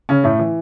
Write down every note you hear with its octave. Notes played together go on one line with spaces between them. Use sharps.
C#3 C#4
A2 A3
E3